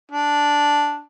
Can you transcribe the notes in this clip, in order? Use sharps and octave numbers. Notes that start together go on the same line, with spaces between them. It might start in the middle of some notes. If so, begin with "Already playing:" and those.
D4